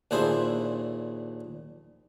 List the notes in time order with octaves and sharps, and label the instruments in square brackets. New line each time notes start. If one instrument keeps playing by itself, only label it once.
[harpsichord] D#2 A#2 D4 E4 G#4 C5